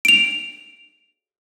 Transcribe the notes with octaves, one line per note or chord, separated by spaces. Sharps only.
D7 F7